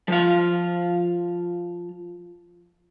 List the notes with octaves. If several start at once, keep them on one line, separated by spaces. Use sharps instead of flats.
F3 F5